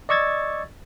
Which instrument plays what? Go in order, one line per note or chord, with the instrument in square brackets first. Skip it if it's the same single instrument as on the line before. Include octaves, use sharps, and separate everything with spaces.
[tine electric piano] D5 D#5 C#6 E6 G#6 A6